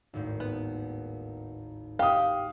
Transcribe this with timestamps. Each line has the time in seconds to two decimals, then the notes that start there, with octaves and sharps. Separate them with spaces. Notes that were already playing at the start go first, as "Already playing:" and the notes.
0.13 G#1 D#2 A2
0.40 B3
1.99 G4 F5 D#6